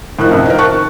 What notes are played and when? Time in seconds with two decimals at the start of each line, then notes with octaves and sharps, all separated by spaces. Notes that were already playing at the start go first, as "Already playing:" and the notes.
0.19 A2 D#3 F3 F#6
0.31 C2 F#2
0.46 D#4 A#4
0.58 A5 C#6 F#6